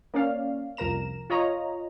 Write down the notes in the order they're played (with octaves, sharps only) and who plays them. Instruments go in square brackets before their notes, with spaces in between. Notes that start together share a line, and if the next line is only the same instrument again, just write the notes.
[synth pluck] A#3 C#4 D5 F5
C2 F2 A#4 A#5 E7
F4 C#5 D#5 A#5